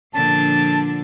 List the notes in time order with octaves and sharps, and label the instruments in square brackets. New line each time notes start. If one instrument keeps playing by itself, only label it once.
[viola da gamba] A#2 D3 F3 [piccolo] A5